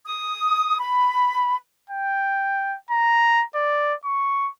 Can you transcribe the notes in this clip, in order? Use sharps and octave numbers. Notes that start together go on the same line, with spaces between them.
D#6
B5
G5
A#5
D5
C#6